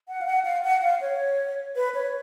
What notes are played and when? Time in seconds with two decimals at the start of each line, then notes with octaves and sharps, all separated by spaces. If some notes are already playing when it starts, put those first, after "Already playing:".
0.08 F#5
0.21 F5
0.27 F#5
0.45 F5
0.64 F#5
0.82 F5
1.01 C#5
1.76 B4
1.95 C#5